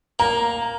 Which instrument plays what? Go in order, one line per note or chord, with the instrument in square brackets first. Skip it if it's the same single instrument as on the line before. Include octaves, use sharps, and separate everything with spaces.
[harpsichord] A#3 [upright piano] A#5